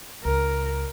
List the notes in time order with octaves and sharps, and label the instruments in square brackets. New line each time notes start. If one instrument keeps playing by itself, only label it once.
[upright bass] C#2 [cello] A#4